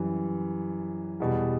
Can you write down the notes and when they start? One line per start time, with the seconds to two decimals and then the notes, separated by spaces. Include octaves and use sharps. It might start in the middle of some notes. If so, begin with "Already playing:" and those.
Already playing: F#2 E3 G3
1.20 E2 B2 G3